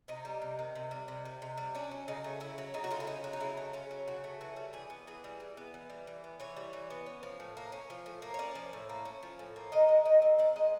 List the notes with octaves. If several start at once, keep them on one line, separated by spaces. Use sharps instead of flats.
C3 D#4
G3
C3
D#3
C3
G3
C3
D#3
C3
G3
C#4 D4
F#3
C#3 D#4
A3
C#4 E4
F#3
C#3 D#4
F#4
A3 F4
E4
C#4 D#4
F#3
D#4
C#3 E4
A3
C#4 F4
F#3
C#3 F#4
A3
E3 F#4
G3
E3 G#4
B3
E3 G#4
G3
E3
B3
E3
G3
E3
B3
E3 C#5
G3
E3
B3
C#4
F3
A2
A#3
C#4
F3
A2
A#3
C#5
C#4 D5
F3
A2
A#3
C#4
F3
A2
A#3
D#3 D#5
G#3
D#3 D#5
C4
D#3 D5
G#3 D#5